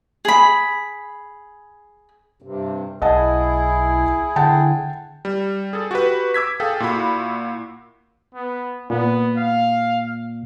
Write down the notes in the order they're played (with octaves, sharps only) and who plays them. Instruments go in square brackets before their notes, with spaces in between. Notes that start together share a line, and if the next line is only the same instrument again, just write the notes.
[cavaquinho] G#4 B5
[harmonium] G2 C3
[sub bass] B1 [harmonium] E4 G#4 [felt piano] D#5 F#5 A5
[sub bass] D3 [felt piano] F#5 G5 A5
[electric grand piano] G3
G#4 A4
F#4 G4 B4
D6 E6 G#6 B6
G#4 A4 F5 G5
A#2 E4 F#4 B5
[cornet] B3
[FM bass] A#2 [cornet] B3
[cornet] F5